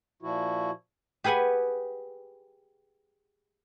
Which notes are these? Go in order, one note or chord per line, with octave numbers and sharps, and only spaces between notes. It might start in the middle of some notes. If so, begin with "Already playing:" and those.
A#2 F3 E4 F#4
G4 G#4 B4 F#5 G#5